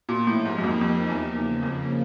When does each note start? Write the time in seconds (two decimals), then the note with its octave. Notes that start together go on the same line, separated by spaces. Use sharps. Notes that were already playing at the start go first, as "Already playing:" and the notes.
0.09 A#2
0.26 A2 F3 A#3 D#4 G4 A#4
0.45 G#2
0.58 F#2
0.64 F2
0.81 F2
1.08 E2
1.35 E2 C#3 F3 A#3
1.63 F2